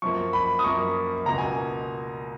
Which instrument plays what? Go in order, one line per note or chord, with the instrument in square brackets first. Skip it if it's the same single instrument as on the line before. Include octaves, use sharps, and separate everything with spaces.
[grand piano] F#2 F3 A#3 C#6
B5
D#6
F#2 F3 A#3 C#6
C#2 B2 A#3 A#5
G#5